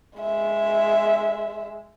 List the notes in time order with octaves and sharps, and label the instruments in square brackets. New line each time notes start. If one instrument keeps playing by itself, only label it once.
[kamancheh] G#3 E5